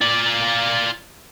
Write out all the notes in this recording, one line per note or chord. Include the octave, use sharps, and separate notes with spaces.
F4 D5